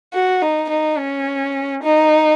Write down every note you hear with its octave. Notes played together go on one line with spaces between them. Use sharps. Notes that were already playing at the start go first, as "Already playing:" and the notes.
F#4
D#4
D#4
C#4
D#4